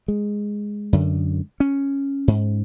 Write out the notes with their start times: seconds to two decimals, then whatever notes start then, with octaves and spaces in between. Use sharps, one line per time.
0.08 G#3
0.93 F#2 D3
1.60 C#4
2.28 G#2